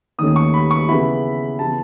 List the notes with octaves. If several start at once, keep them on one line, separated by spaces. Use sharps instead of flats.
D#2 D#3 A3 C#4 D#6
C#6
B5
C#6
C#3 E3 B3 E4 B5
C#3 E3 B3 A5